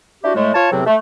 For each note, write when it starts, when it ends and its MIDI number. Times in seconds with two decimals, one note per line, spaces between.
0.24 0.33 62
0.24 0.33 64
0.24 0.33 66
0.24 0.33 67
0.36 0.52 45
0.36 0.52 56
0.36 0.52 57
0.55 0.68 65
0.55 0.68 73
0.55 0.68 81
0.71 0.83 40
0.71 0.83 45
0.71 0.83 48
0.71 0.83 54
0.71 0.83 60
0.86 0.96 57